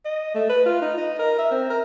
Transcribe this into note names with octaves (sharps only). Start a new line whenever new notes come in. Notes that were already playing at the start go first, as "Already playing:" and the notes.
D#5
A3
B4
F4
D#4
D#5
A#4
E5
C4
A#4